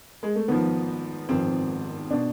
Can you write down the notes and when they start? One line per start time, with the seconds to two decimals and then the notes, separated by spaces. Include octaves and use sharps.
0.23 G#3
0.35 A3
0.48 G#1 G#2 F3 B3
1.29 G#1 G#2 F3 C4
2.11 B2 D4